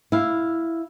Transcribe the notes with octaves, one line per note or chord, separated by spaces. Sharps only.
E4 F5